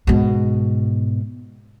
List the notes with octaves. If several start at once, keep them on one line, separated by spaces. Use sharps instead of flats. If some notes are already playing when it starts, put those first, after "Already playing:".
G#2 B2